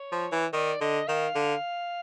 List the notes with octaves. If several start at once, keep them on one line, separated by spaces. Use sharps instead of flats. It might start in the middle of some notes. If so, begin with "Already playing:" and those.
Already playing: C#5
F3
E3
D#3 D5
D3 D#5
D#3 F5
D3